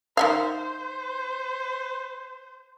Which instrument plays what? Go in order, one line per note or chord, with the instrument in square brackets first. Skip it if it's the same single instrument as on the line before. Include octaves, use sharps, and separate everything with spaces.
[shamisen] D#3 E5 F5 [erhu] C5